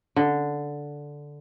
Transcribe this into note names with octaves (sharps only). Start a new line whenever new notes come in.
D3